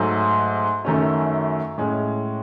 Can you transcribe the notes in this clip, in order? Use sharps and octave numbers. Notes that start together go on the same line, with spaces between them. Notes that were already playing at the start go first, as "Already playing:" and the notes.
Already playing: G#2 F#3 A3
F#2 D#3 A3 C#4
A2 G#3 C#4